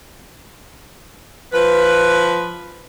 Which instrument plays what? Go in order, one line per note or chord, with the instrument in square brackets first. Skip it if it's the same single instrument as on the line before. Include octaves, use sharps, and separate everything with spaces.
[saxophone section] F3 B4